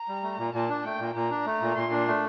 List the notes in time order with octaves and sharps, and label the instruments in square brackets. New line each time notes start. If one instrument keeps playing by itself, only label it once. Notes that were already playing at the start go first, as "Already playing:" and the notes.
Already playing: [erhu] A#5
[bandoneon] G3
A3
A#2
[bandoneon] A#2 [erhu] A5
[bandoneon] D4
[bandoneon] A3 [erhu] G5
[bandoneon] A#2
[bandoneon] A#2 [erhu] A#5
[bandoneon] D4
A3
A#2
[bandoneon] A#2 [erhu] C6
[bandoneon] D4
A3